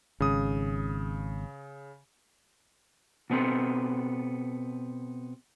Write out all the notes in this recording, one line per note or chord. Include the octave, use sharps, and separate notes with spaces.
G#1 C#3 D#6
B2 B3 C4 A4